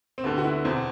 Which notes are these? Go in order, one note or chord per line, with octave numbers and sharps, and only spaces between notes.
C4
D2 D3 B3
F#4
E4
E2 B2 C4